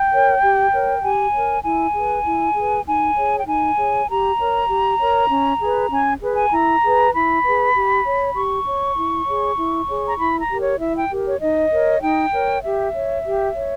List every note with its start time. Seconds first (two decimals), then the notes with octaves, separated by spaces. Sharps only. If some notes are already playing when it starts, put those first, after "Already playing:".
Already playing: G5
0.11 A#4 C#5
0.42 G4
0.73 A#4 C#5
1.02 G4 G#5
1.33 A#4 C#5
1.63 E4 G#5
1.94 G#4 B4
2.25 E4
2.55 G#4 B4
2.86 D#4 G#5
3.17 G#4 C#5
3.39 G5
3.47 D#4 G#5
3.78 G#4 C#5
4.08 G4 A#5
4.39 A#4 C#5
4.70 G4
5.00 A#4 C#5
5.30 C#4
5.61 G#4 B4
5.92 C#4 G#5
6.21 G#4 B4
6.33 G#5
6.48 B5
6.52 E4 A#5
6.83 G#4 B4
7.14 E4 B5
7.45 G#4 B4
7.75 G4
8.06 C#5
8.35 G4 C#6
8.67 C#5
8.97 E4
9.27 G#4 C#5
9.58 E4
9.89 G#4 C#5
10.07 A#5
10.19 E4 B5
10.39 A#5
10.50 G4 A#4
10.60 C#5
10.80 E4 E5
10.95 G5
11.11 G4 A#4
11.26 C#5
11.42 D#4 D#5
11.72 A#4 C#5
12.02 D#4 G5
12.32 A#4 C#5
12.64 G4 E5
12.94 C#5
13.24 G4
13.55 C#5